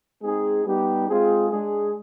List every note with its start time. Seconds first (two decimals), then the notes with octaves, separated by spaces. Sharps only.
0.22 G#3 C4 D#4 G#4
0.64 G3 B3 D#4 G4
1.08 G#3 C4 F4 G#4
1.50 G#3 D4 G#4